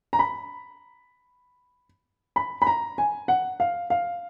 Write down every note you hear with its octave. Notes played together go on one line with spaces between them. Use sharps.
A#5
B5
B5
B5
A#5
G#5
F#5
F5
F5